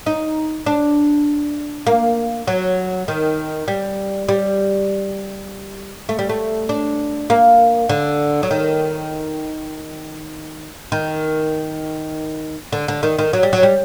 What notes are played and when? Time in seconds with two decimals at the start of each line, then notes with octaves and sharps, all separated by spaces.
0.06 D#4
0.66 D4
1.87 A#3
2.47 F#3
3.08 D#3
3.68 G3
4.29 G3
6.09 A3
6.19 G3
6.29 A3
6.69 D4
7.30 A#3
7.89 D3
8.43 F#3
8.51 D#3
10.92 D#3
12.73 D3
12.88 D3
13.03 D#3
13.19 D#3
13.33 F#3
13.43 G3
13.53 F#3
13.63 G3